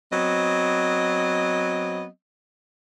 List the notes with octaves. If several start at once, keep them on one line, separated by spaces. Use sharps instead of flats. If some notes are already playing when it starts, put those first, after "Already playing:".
F#3 B3 C4 D#5